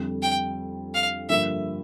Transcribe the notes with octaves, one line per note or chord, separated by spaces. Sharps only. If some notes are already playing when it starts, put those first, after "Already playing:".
Already playing: F2 D3 G3
G5
F5
G2 D3 F3 A#3 E5